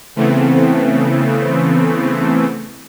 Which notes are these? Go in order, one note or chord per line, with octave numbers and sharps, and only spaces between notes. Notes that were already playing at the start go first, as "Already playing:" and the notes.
C#3 E3 A3 B3 C4